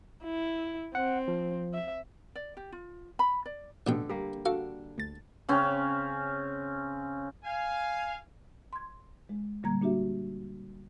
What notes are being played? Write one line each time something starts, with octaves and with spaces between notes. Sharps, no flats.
E4
C4 F#5
F3
E5
D5
G4
F4
B5
D5
A1 B2 D3 A4 G5
G3 A#3 G4
D4 F#4 A4 F5 F#5
D2 A6
C#3 C4 C#4
F5 G#5
C6 G#6
G#3
A#2 D3 G3 A#3 A#5 G#6
A#3 D4 F#4 G4 E5